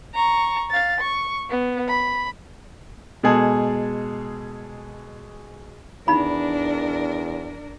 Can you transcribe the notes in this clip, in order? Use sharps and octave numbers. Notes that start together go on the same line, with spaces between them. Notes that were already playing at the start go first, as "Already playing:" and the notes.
A#5 C#6
F5 A6
C#6
B3
B5
B2 G#3 G#4 A4
E2 D4 D#4 A#4 B5